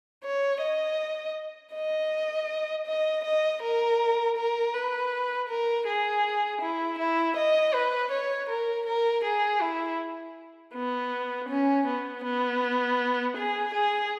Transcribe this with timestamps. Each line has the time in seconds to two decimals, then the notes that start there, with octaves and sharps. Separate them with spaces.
0.24 C#5
0.62 D#5
1.74 D#5
2.87 D#5
3.24 D#5
3.62 A#4
4.37 A#4
4.74 B4
5.49 A#4
5.86 G#4
6.61 E4
6.99 E4
7.37 D#5
7.74 B4
8.12 C#5
8.49 A#4
8.87 A#4
9.25 G#4
9.62 E4
10.74 B3
11.49 C#4
11.87 B3
12.24 B3
13.37 G#4
13.74 G#4